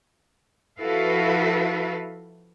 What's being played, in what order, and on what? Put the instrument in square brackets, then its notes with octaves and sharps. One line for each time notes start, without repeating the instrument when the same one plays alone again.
[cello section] F3 E4 F#4 A4 B4 F5